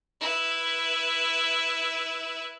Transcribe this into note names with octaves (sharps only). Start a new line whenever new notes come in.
E4 B4